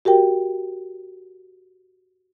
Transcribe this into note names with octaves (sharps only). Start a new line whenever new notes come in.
F#4 G4 A#4 G5